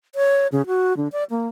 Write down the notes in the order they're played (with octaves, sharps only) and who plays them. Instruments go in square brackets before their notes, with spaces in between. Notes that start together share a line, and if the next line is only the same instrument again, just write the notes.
[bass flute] C#5
C#3
F#4
D3
D5
A#3